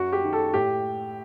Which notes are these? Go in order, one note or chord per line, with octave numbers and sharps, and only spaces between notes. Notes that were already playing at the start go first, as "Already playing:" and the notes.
Already playing: F#2 F#4
G4
D#3
A4
A2 G4